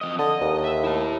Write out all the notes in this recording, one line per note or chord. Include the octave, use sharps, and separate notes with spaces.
F2 F3 D#5
D3 D#5
D#2
E5
E4 A5